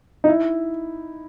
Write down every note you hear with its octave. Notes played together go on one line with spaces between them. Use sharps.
D#4
E4